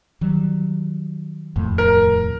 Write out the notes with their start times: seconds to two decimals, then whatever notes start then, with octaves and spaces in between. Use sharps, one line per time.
0.21 D#3 F#3 G3
1.56 D#1 F2 A2
1.78 A#4